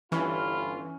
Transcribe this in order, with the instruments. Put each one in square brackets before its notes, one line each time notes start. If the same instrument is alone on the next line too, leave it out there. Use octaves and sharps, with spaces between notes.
[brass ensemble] G1 G2 F4 [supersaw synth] E3 [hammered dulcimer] C#4 [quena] B5